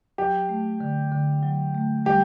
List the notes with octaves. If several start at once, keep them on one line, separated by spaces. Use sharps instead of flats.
F#3 G4
A3
D3
D3
F#3
A3
G3 G4